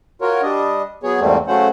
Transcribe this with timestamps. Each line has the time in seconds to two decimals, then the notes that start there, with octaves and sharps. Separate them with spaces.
0.21 F4 F#4 A#4 C#5
0.43 G3 D4 D#5
1.03 F#3 B3 G#4 C#5
1.20 E2 G#2 G3 A3 A#3 C4
1.47 C#3 F#3 A3 C#4 C5 F#5